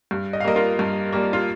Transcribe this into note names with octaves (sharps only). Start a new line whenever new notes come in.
G2
D#5
F5
G3 A#3 A#4 D#5
F4 A#4
G2
G3 A#3
F4